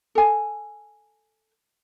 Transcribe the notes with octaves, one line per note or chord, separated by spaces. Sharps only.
A4 G#5